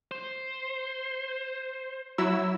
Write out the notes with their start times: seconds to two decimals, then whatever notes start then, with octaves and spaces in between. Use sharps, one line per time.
0.11 C5
2.18 F#3 E4 E6